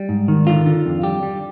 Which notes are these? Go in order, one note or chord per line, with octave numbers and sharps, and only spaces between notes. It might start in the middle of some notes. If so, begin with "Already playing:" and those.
Already playing: G3
G#2
D#3
D3 F4
D3
F2
G3 G4
G3